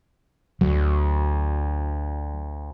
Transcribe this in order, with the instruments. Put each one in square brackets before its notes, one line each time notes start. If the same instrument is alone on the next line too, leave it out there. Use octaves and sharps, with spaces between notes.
[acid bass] D2 [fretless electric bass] F#3